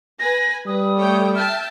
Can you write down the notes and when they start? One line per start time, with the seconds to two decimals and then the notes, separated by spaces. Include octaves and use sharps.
0.19 B4 G#5 A#6
0.67 G3 B4 D#6
0.97 A3 C#5 G5
1.35 E5 G5 A5 F6